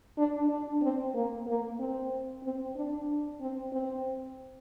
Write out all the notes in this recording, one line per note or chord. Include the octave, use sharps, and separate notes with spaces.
D4
D4
C4
A#3
A#3
C4
C4
D4
C4
C4